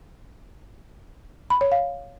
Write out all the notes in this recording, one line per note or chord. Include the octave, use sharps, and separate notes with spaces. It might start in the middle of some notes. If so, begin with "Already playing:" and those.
B5
C#5
F5